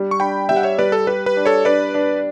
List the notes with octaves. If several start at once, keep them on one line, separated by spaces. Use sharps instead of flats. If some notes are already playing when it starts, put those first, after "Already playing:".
Already playing: G3 D4
C#6
D4 G5 B5
G3 E5 G5
F#5
C#5 E5
G3 B4 D5
A4
G4 B4
B4
D4
A4 C#5
D4 B4 D5
D4